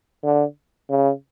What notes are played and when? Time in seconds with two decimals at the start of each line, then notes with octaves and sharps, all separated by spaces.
0.23 D3
0.90 C#3